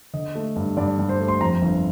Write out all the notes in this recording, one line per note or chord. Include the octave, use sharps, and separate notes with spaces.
D3 D#5
A3
G2
G2 D5
G2
C5
A3
C6
F2 A#5
G1